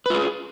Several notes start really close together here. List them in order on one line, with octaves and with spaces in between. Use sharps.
B4 F4 G#4